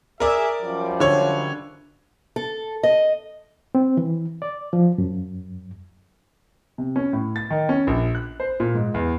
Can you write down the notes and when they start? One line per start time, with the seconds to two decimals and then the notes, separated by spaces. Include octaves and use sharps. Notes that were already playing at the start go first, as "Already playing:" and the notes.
0.20 G#4 A#4 D5 E5
0.62 F#2 F3 G3
1.00 D3 C#5
2.36 A4
2.83 D#5
3.75 C4
3.97 E3
4.42 D5
4.73 F3
4.98 F#2
6.78 C3
6.96 C#4
7.13 A2
7.36 A6
7.51 D#3
7.69 C#4
7.87 A#1
8.15 F#6
8.40 C5
8.60 A#2
8.75 G#2
8.94 E2